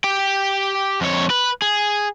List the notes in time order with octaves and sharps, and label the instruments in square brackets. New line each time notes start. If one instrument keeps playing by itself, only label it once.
[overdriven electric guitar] G4 G5
F2 C#5
B4
G#4